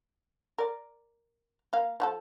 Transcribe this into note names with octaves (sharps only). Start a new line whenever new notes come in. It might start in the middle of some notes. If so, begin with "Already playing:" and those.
A#4 D5
A#3 F5
F3 F#4 A4